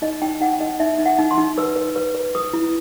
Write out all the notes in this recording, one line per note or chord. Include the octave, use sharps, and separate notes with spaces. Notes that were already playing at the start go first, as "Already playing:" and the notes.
D#4 D#5
D#4 G5
D#4 F#5
D#4 D#5
D#4 E5
D#4
F#5
D#4
C6
D#4
B4 E6
B4
B4
B4
B4 D#6
E4